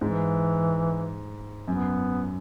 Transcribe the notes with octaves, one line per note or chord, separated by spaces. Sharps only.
G#2 E3
F#2 B3